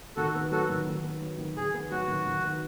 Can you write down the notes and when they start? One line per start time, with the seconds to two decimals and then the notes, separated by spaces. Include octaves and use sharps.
0.16 D#3 F#4 A4
0.35 B3
0.52 F#3 F#4 A4
0.69 D#3
0.87 D#3
1.03 B3
1.21 F#3
1.38 D#3
1.57 D#3 G#4
1.74 B3
1.91 F#3 F#4
2.08 D#3
2.26 D#3
2.44 B3